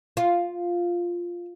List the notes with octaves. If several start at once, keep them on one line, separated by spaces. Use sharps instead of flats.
F4